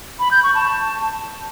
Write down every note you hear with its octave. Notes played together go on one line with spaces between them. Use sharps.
B5
G6
C#6
A5